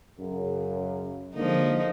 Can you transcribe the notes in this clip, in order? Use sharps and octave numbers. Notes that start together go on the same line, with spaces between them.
F#2 C#3
D3 F3 G#3 A#3 D#4